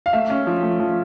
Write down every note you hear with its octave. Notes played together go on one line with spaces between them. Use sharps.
F5
A3 E5
C#4
F3
A3
F3